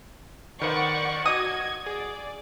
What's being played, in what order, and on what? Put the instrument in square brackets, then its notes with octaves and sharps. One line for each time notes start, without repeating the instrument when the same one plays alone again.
[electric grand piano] D#3 B4 C5 [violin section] D5 F#5 C#6
[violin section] F#4 G#6 [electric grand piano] D#5 D6 [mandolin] D#6
[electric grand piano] G#4 [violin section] D5